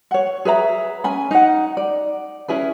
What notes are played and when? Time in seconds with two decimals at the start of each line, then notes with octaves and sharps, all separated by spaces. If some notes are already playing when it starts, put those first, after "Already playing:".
0.11 C#5 F#5
0.45 G#4 B4 E5 A#5
1.04 C#4 G#5 B5
1.31 D#4 F#5
1.77 D5
2.48 C#4 E4 G#4 B4